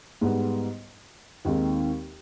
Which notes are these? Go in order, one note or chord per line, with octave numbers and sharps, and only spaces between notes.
G#2 G3 B3
D#2 D#3 G#3 C4